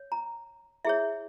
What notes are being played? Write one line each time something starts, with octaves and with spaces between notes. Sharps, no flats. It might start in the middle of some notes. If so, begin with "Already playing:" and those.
Already playing: C#5
A#5
E4 G#4 C#5 E5